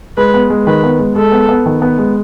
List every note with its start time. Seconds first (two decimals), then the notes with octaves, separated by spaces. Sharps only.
0.17 G#3 B4
0.34 B3
0.50 G#3
0.66 D#3 B4
0.84 B3
0.99 G#3
1.16 G#3 A4
1.32 B3
1.49 B3
1.66 D#3
1.82 B3
1.98 G#3